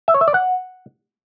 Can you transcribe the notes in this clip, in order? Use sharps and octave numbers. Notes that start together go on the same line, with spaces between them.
E5
C#5
E5
D5
F#5